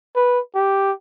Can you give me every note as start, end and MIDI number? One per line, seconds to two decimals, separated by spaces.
0.16 0.40 71
0.55 0.92 67